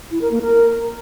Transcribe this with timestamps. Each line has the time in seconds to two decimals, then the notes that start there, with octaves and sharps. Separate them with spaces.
0.11 E4
0.21 A#4
0.32 A#3
0.42 A#4